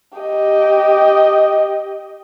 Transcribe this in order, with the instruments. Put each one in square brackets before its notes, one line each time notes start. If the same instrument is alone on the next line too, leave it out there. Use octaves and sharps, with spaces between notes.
[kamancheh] G4 D#5